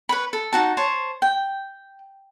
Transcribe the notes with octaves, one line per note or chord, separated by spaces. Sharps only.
B4 C#5 B5
A4
D#4 F#4 A5
C5 C#5 A5
G5